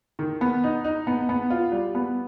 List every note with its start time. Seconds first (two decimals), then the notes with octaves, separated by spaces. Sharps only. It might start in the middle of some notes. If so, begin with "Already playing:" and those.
0.19 D#3
0.41 B3
0.64 D#4
0.84 D#4
1.07 B3
1.29 B3
1.50 F4
1.72 G3
1.95 B3